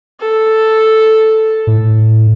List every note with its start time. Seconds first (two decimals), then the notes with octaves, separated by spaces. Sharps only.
0.21 A4
1.67 A2